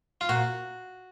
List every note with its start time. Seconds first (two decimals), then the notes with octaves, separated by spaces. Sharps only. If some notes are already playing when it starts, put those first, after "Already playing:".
0.21 F4
0.29 A#2 F#4